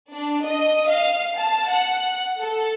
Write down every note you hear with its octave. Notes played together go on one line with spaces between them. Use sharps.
D4
D#5
F5
A5
F#5
A4